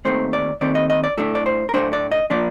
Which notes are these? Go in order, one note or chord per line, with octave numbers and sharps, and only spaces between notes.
D#2 D#3 A3 C4 C5
D5
D#2 D#3 A3 C4 D5
D#5
D#5
D5
A2 A3 D4 A4
D5
C5
A#4
A2 A3 D4 C5
D5
D#5
F3 A#3 D4 D5